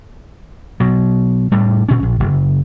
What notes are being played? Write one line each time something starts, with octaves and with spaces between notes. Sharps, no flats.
B2 F#3
A2 G3 A3
A#2 C#4
A#1
F#1